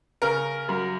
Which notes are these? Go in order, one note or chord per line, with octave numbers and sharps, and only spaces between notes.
C#3 A#4
F#2